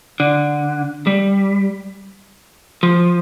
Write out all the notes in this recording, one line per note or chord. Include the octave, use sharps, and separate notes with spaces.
D3
G3
F3